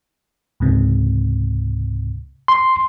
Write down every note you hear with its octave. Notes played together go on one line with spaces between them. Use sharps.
C#2 G#2 C3
C6